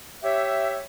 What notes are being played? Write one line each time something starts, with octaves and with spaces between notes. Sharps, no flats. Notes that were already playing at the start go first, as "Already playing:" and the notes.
G4 C#5 E5